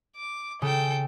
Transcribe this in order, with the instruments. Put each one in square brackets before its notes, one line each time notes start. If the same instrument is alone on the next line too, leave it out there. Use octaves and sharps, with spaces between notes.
[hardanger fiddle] D6
[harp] C#3 [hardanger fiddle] A4 G5